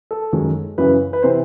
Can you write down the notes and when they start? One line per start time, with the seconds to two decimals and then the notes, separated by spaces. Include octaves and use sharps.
0.11 A4
0.33 F#2 D#3 G#3
0.78 F#2 C#3 E3 B4
1.13 B4
1.22 C3 E3 C5